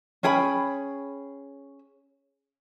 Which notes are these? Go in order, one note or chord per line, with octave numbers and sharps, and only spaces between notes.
C#4 G#4 G5 B5